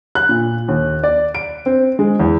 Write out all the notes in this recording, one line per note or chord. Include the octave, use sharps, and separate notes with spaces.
F#6
A#2
D#2
D5
D7
C4
G#3
E2